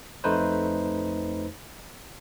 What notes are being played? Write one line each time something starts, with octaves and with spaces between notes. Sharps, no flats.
F2 A3 D#4 B4 C5